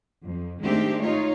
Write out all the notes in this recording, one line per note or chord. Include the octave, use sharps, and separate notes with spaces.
F2
D#3 G#3 A3 C4 D4 G4
D#4 F4 C#5